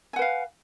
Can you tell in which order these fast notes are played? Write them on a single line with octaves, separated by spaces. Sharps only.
G#5 F#5 B4 F5